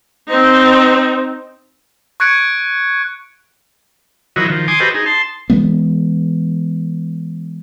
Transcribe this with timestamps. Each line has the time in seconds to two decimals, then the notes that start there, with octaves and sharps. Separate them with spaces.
0.28 C4 D#4
2.20 C#6 F#6 G#6 C#7 D7
4.36 D#3 F3 F#3 E4 F#4 D#5
4.50 D#3 F3
4.68 G#5 C6 D6 D#6
4.80 F#4 G4 A4 B4 C5 D#5
4.94 D#4 G#4
5.06 A5 C6
5.50 E3 G#3 B3